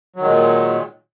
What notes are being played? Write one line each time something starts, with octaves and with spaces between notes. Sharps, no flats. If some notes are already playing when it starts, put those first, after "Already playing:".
A#2 D#3 F#3 G#3